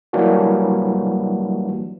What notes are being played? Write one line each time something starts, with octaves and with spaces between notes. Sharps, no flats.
E3 F#3 G3 A#3 D4 F#4